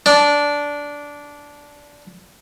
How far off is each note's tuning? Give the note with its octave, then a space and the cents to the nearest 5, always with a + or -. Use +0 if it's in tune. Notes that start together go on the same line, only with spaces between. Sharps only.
D4 -15